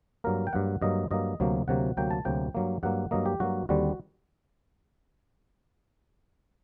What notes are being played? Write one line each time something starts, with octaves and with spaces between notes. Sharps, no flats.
G2 F#3 A#3 A#4
G5
G2 F#3 A#3 F#5
G2 F#3 A#3 D#5
G2 F#3 A#3 D#5
D2 C3 F#3 A#3
D2 C3 F#3 A#3 F#5
D2 C3 F#3 A#3 G5
A5
D2 C3 F#3 A#3 G5
G2 F#3 A#3
G2 F#3 A#3 F#5
G2 F#3 A#3 D#5
G4
G2 F#3 A#3 F#4
D#2 D3 G3 C4 F#4